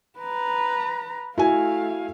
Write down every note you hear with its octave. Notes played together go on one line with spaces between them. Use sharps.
B4 A#5
A3 E4 F#4 F5 G#5